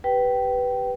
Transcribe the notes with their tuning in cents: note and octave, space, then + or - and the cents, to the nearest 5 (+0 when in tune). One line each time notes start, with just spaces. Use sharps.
G4 +0 B4 +0 G5 -15